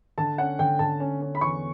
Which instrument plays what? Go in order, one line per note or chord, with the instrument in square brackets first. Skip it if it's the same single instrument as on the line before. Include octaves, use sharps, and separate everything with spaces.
[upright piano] D3 [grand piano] A5
[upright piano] C#4 [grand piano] F#5
[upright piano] D3 [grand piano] G5
[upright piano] D3 [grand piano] A5
[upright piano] C#4
C#4
[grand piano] B5
[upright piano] E2 [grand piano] C#6